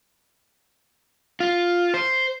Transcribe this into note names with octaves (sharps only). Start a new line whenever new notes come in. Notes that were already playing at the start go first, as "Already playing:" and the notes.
F4
C5